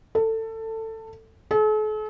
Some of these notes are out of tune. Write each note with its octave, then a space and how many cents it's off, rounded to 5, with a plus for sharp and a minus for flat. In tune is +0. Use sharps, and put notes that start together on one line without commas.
A4 +20
A4 -45